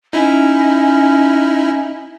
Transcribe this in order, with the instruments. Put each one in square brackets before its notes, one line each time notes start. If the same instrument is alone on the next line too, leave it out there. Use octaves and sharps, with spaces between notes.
[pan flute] C#4 [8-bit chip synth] D#4 E4